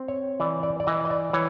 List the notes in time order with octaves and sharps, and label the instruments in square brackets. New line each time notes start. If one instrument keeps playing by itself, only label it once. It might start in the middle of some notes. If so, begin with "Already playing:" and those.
Already playing: [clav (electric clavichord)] C4
C#5
E3 D5
D5
D5
E3 D#5
D#5
D5
E3 C#5